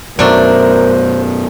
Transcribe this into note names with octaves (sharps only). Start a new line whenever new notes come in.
F#2 B2 F#3 A3 D4 A#4 C5